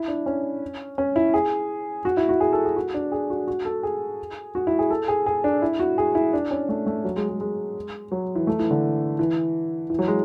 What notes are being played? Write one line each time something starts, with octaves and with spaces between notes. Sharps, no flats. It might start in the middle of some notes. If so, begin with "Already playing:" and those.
Already playing: E4
D4
C#4
C#4
E4
G#4
F#4
E4
F#4
G#4
A4
G#4
F#4
D4
G#4
F#4
F#4
A4
G#4
F#4
E4
G#4
A4
G#4
G#4
D4
E4
F#4
G#4
E4
D4
C#4
A3
A3
F#3
G#3
G#3
G#3
F#3
E3
A3
E3
D3
E3
E3
F#3
G#3